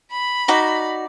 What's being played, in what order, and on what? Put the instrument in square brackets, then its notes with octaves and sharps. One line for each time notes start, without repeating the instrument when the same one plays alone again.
[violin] B5
[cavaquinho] D#4 F#4 D5